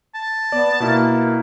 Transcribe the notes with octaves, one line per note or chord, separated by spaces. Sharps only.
A5
B3 D5
B2 A#3 E4